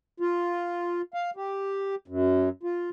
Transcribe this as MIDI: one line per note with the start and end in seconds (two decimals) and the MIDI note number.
0.20 1.02 65
1.14 1.30 77
1.36 1.95 67
2.08 2.49 42
2.63 2.90 65